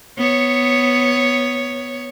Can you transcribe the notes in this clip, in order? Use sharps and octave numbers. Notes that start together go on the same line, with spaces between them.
B3 C#5